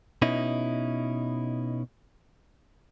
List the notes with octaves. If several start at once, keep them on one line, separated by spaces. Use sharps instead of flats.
B2 C#4 D#4 E4